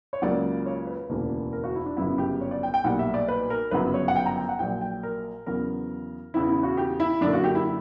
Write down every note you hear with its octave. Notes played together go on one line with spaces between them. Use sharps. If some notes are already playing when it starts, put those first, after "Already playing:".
C#5
C#2 C#3 F#3 A#3 D5
C#5
B4
E1 D2 C#3 E3 A#3
A#4
F#4
E4
D4
G1 F#2 C#3 F#3 E4
G4
C#5
D5
G5
G5
B1 A#2 G3 F#5
E5
D5
B4
A#4
G1 F#2 C#3 F#3 B4
C#5
F#5
G5
A#5
G5
F#5
A#1 A#2 F#3 G5
G5
A#4
E2 C#3 F#3 B3 A#4
E2 C#3 E3 B3 E4
E4
F#4
G4
E4
F#2 D3 A#3 D4
F#4
G4
E4